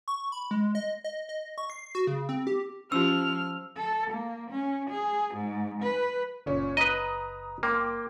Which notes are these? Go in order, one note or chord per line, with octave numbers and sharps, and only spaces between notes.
C#6
B5
G#3
D#5
D#5
D#5
C#6
C7
F#4
C#3
C4
G4
F3 C#4 F4 G4 E6 F6
A4
A#3
C#4
G#4
G#2
B4
F#1 A#2 C#4
B4 D#5 A#5 D#6
A#3 G5 C6 D6